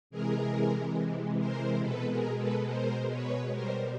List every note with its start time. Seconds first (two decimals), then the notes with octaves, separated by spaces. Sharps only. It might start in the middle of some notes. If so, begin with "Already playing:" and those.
0.10 C3 E3 G#3 G#4 A#4
1.38 A#4 C5
1.81 B2 G#3 A4 B4
2.10 G#4 A#4
2.38 A4 B4
2.67 A#4 C5
3.09 B4 C#5
3.52 B2 G3 A#4 C5